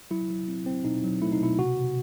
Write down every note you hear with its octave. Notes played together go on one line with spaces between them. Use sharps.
F#3 E4
F#3
C4
C4
B2 D#4
F#3
A3 E4
D#4
B2 E4
C3 F#4
C3